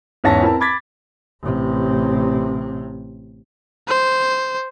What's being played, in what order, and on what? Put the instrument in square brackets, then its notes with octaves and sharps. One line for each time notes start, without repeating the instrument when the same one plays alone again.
[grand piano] E2 G#2 C#4 E5 A5 A#6
C4 E4 A#4 A5
B5 D6 G#6 A6 B6
[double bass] A1 C3
[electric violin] C5